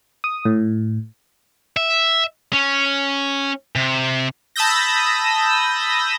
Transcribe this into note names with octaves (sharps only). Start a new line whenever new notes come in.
D#6
A2
E5
C#4
C3
A5 B5 D#6 E6 G6 A#6